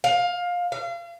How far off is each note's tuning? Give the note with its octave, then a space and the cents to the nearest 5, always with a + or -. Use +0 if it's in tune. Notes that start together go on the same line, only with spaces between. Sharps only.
F5 +20
F5 -35